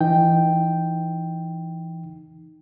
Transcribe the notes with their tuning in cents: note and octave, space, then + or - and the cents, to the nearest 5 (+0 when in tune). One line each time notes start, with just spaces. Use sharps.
E3 +20 D#4 +0 G5 +0